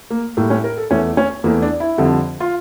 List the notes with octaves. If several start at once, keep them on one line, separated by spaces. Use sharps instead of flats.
A#3
A2 G3 A#3
C#4
A#4
A4
E2 E3 A3 C#4
C#4
E2 E3 A3 A#3
D4
E4
F2 D3 G3
F4